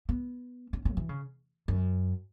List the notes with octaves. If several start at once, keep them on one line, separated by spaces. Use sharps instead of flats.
B3
C#4
C#4
F#3
E3
C#3
F#2